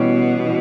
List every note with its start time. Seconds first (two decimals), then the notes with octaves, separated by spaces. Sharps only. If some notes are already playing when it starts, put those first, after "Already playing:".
Already playing: B2 E3 G3 C#4
0.46 E3